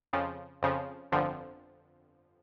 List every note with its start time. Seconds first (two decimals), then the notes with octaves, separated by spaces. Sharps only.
0.13 F2 C#3 F3
0.62 F2 C#3 F3
1.11 G1 F2 D3 F3